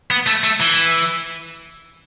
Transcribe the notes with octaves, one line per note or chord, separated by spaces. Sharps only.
B3
A3
A3
E3